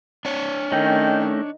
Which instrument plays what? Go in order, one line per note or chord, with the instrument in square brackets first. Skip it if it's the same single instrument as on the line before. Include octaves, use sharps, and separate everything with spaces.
[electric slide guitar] D4 C#5
[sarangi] D#3 [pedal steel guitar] A3 C#4 D#4 [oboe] G5